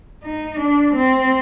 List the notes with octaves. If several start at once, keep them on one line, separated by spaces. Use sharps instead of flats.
D#4
D4
C4